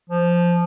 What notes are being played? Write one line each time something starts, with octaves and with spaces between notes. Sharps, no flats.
F3